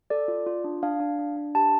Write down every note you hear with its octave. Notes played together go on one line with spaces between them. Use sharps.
A4 D5
F4
F4
D4
D4 F5
D4
D4
D4
G4 A5